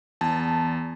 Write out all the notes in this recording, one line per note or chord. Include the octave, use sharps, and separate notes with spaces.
E2 A5